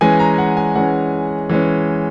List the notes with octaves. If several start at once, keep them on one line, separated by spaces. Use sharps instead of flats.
E3 G#3 C#4 G#5
A#5
F#5
G#5
E3 G#3 C#4 F#5
E3 G#3 C#4